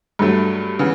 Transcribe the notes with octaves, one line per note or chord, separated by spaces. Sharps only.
G2 F#3 A3
C#3 E3 B3